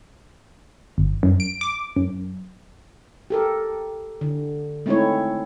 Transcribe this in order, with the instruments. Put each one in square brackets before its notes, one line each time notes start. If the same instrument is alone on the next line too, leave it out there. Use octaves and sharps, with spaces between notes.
[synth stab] G1
F#2
D7
D6
F#2
[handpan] G4 A4 A#4
D3
G#3 A3 C4 D#4 E4 C#5